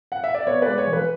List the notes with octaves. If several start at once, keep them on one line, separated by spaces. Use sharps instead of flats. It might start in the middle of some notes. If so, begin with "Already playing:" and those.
F#5
E5
D5
B3 C#5
B4 D5
G#3
C#5
E3
B4